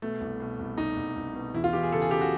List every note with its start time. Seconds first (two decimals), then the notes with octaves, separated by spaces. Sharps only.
0.02 B2 A3
0.20 C2
0.40 B2
0.59 C2
0.78 C2 D#4
0.97 C2
1.16 C2
1.35 B2
1.54 E2 E4
1.64 F4
1.73 E3 G4
1.83 G#4
1.92 C#3 A4
2.02 G#4
2.11 C#3 G4
2.21 F#4